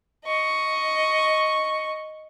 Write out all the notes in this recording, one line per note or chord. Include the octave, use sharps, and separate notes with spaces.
D#5 C#6